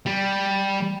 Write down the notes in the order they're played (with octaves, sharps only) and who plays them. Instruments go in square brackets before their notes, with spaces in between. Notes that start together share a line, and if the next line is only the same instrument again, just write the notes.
[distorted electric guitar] G3